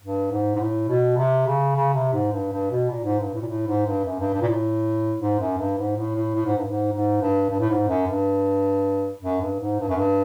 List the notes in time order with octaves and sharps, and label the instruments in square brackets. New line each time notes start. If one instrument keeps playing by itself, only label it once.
[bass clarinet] G2
G#2
G#2
A2
B2
C3
C#3
C#3
C3
G#2
G2
G2
B2
A#2
G#2
G2
A2
A#2
A2
G#2
G2
F#2
G2
G2
A#2
A2
G#2
F#2
G2
G#2
A2
A2
A2
G#2
G2
G#2
G#2
G2
G2
A2
G#2
F#2
G2
F#2
G2
G#2
G2
F#2
G2